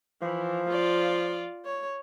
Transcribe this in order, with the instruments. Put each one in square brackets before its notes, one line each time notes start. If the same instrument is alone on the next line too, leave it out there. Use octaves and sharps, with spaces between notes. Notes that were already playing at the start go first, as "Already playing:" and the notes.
[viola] E3 [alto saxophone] F3
[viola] F4 D5
C#5